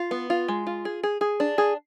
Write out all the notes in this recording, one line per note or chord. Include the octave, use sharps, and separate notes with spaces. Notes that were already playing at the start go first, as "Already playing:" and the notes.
Already playing: F4
B3
F4
G#3
F4
G#4
G#4
G#4
D4
G#4